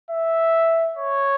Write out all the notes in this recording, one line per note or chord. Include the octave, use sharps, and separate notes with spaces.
E5
C#5